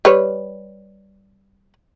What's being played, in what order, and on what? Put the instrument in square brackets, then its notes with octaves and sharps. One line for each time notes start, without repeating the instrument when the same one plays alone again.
[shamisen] G3 B4 C#5